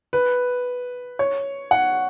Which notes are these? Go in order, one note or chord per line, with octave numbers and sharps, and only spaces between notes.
B4
C#5
F#5